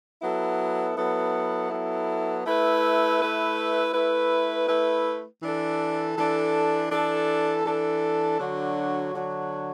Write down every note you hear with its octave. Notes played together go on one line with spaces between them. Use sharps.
F#3 B3 E4 A4
F#3 B3 E4 A4
F#3 B3 E4 A4
A3 E4 B4
A3 E4 B4
A3 E4 B4
A3 E4 B4
E3 D4 A4
E3 D4 A4
E3 D4 A4
E3 D4 A4
D3 F#3 D4 F#4
D3 F#3 D4 F#4